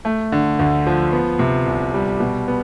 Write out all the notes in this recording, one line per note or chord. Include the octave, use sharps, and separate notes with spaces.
A3
D3
D2
F3
B3
C3
C2
G3
B2
B3